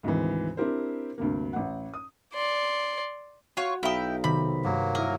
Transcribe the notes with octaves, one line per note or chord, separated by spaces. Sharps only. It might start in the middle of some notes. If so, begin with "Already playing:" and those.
D2 G#2 C3 D#3 E3
C4 D4 E4 G4 A#4 C5
D2 G2 C3 A#3
A1 F#5
D#6
D5 C6
F4 F#4 C#5
B1 E4 F5 G5 A#5 D#6
C3 D#3 C4 B5
G2 F#3 A#3
E4 A#4 D#6 B6